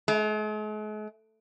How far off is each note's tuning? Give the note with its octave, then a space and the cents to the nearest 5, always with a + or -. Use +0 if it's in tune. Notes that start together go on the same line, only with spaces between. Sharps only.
G#3 +45